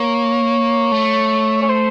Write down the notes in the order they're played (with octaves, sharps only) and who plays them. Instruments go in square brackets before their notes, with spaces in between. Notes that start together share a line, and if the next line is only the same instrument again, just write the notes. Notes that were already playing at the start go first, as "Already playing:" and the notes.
Already playing: [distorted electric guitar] A#3 [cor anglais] C#5
[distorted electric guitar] A3
[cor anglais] C#5
C5